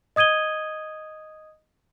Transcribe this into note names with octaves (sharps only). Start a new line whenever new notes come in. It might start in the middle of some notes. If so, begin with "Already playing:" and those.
D#5 D#6 G#6 D#7 G7